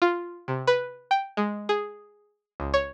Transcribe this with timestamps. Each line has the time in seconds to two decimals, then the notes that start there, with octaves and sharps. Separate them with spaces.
0.02 F4
0.48 C3
0.67 B4
1.11 G5
1.37 G#3
1.69 G#4
2.60 C#2
2.74 C#5